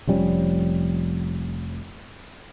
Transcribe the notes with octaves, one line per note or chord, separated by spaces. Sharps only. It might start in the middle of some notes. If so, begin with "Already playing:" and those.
F1 F3 G3 C#4